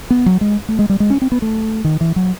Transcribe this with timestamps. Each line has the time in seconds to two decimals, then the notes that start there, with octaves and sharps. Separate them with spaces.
0.10 B3
0.26 F#3
0.41 G#3
0.69 A3
0.79 G#3
0.90 G3
1.00 G#3
1.10 C#4
1.22 C4
1.32 B3
1.42 A3
1.84 D#3
2.01 E3
2.16 F#3